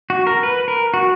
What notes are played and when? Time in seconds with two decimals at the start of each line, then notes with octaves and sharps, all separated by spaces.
0.10 F#4
0.27 A#4
0.43 B4
0.68 A#4
0.94 F#4